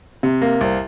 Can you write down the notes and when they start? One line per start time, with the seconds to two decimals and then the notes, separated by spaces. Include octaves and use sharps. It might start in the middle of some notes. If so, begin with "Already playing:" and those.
0.23 C3
0.41 A#3
0.61 C2